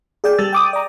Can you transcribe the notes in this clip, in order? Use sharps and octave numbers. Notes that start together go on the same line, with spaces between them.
G#4 D5 G5 G#5
G3 A4 E6 A6
G5 D6 D#6
D5 A#5